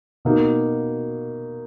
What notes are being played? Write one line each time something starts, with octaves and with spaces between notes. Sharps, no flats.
B2 A#3 D#4